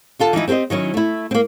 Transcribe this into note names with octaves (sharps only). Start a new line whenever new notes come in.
D3 F4 A4
E3 F3 D#4 E4
C4 G4 B4 C5 D#5
D#3 F#3 C#4 E4
A3 E4
A#3 C4